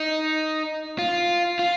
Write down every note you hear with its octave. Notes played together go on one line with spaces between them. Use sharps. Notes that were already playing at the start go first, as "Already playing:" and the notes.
Already playing: D#4
F4
F4